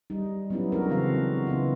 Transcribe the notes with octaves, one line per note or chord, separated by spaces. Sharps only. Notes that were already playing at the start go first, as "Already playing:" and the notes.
G3 D#4
F#3 B3 C#4 D#4 E4 G4
G#3 D4 D#4 F#4 A4 A#4
C#3 E3 B3 C4 F#4 F5
C#3 B3 D4 E4 F4